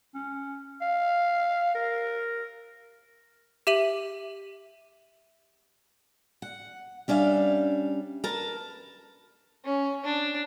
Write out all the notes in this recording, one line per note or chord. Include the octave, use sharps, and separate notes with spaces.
C#4
F5
A#4
G4 E5 D#7 F#7
F#5
G3 C#4 D4 E5 F5
A#4 B4 A5
C#4
D4